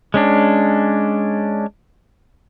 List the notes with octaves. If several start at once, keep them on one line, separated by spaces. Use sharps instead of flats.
G#3 C#4 D4